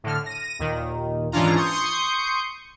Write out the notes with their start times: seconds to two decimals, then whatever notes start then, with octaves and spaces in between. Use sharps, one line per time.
0.04 A2 D3 F6
0.26 A#6 D#7
0.59 D#2 A#2 D#3
1.32 G#2 E3 C#4 D4 F4 A#5
1.57 C6 C#6 D#6 G6 C#7